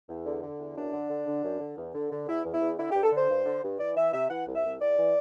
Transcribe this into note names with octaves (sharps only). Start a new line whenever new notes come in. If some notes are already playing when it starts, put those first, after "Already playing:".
E2
D3
D3
E2
F#2 D4
D3
D3
D3
F#2
D3
E2
D3
D3
E2 E4
E2
E4
E2
D3 E4
G4
G2
A4
D3 C5
G2
D3
G2
E3 D5
E3 E5
C3 E5
E3 F#5
C2
E5
C2
E2 D5
E3